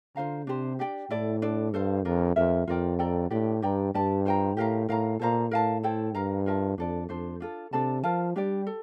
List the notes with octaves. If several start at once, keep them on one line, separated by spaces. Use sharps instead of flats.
D3 F4 C5 F5 A#5
C3 D4 G4 C5
D4 G4 D5 G5
A2 E4 A4 D5
D4 A4 D5
G2 A4 C5 F5
F2 D4 F4 A#4
F2 F4 A#4 E5
F2 F4 A#4 D5 G5
A4 D5 G5 A#5
A2 D4 G4 D5 G5
G2 G4 D5 G5 A#5
G2 G4 D5 A5
F4 C5 G5 A#5
A2 G4 A#4 F5 A#5
A2 A#4 F5 A#5
A#2 A4 C5 F5 A#5
A2 A#4 F5 A5
E4 A4 C5 G5
G2 A#4 F5 A#5
F4 A#4 E5 A5
F2 D4 A4 D5
F2 D4 A4 C5
D4 F4 A4
C3 D4 A4 D5 A5
F3 F4 A#4 F5 A5
G3 D4 G4 D5
A4